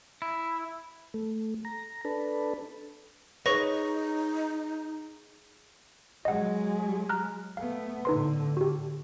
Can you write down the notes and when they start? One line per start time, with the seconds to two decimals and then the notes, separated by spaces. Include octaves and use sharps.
0.22 E4
1.14 A3
1.65 A#5
2.05 D4 A4 B4
3.46 D#4 G#4 B4 C#5 C#6 A#6
6.25 F#3 G#3 D#5 F#5
7.09 A#5 F6 F#6
7.57 A3 B3 F5
8.05 A2 D3 D#4 B4 C6
8.57 F#4 G4